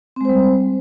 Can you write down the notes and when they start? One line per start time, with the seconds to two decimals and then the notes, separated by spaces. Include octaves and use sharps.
0.16 C4
0.21 G#3
0.25 C5
0.29 G3